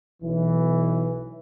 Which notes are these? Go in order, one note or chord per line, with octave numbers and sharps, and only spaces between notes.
B1 E3